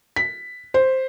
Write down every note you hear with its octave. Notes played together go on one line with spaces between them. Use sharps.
B6
C5